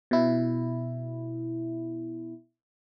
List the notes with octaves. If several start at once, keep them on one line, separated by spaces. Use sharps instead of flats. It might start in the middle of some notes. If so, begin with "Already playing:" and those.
B2 E4